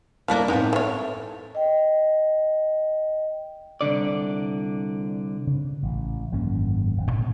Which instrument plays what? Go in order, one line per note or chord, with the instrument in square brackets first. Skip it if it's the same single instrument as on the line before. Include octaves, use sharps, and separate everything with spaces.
[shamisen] F3 A3 D4 [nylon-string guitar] A#3 E4 F5
[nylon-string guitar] A2 C4 D#4 [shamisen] G#3 B3
[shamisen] E3 C#5 [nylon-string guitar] A4
[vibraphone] D#5 G5
[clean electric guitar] C2 F#2 D3 D5
[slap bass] C#3
A1
G#1 F#2 A#3 C#4
D#1
G#2 B2